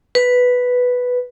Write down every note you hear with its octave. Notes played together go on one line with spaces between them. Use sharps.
B4